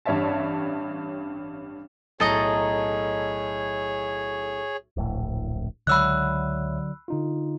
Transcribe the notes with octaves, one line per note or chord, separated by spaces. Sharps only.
A1 G2 C#5 D5 E5 A5
B1 A2 G#4 A4 C#5 D#5 A#5
D1 A#1 A2
C#2 D3 F#3 C#5 E5 B5 E6 F#6
D3 D#4 F4